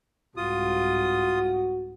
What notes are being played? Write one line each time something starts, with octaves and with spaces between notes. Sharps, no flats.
C2 G#2 F4 F#4 D#6